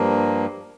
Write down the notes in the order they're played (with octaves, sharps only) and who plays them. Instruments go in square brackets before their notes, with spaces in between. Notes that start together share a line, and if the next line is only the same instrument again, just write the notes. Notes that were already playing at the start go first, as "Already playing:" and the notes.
Already playing: [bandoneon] G2 F3 A#3